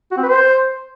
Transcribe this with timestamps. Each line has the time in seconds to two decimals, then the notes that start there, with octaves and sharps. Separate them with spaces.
0.12 F#4
0.17 C4
0.23 B4
0.29 C5